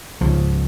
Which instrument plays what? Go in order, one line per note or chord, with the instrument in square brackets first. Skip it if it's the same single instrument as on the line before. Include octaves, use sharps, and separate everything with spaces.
[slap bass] C#2 C#3 F3